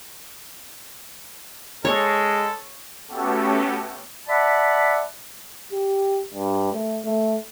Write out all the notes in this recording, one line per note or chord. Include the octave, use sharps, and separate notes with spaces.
G#3 A4 C#5
A3 B3 C#4 F#4 G4 A4
D5 E5 F#5 A5 B5
G4
G2
A3
A3